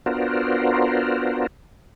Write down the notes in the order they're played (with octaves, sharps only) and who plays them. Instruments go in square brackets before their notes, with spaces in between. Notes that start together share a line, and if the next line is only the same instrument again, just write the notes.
[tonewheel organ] B3 D4 F4 F#4 A#4 C5